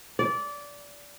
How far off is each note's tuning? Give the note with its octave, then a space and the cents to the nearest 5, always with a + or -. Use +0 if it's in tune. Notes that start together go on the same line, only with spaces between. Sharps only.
D5 -20